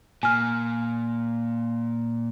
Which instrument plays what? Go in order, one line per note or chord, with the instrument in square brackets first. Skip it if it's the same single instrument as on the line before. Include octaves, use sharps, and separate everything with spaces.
[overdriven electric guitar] A#2 [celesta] G#5 F6